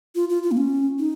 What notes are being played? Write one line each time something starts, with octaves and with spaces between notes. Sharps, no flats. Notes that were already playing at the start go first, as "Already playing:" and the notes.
F4
F4
F4
A#3
C#4
D#4